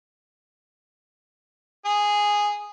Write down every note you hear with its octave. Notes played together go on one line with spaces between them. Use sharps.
G#4